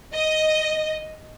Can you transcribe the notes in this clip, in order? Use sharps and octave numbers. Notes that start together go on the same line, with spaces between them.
D#5